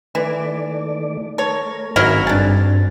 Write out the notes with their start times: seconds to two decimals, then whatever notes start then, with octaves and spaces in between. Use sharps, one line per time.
0.15 D#3 E3 A3 D5
1.38 A3 A4 A#4 C#5
1.96 G#1 F#3 C4 C#4 D#4 E4 A#4 F5
2.27 G2 D4 G#4 A6